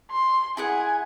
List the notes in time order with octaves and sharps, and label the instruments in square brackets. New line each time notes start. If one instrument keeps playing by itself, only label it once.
[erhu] C6
[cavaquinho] E4 G#4 F#5 [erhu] G#5